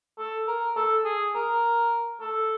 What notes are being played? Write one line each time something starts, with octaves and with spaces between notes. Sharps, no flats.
A4
A#4
A4
G#4
A#4
A4